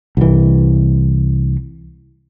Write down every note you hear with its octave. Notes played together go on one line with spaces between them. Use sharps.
C2 E3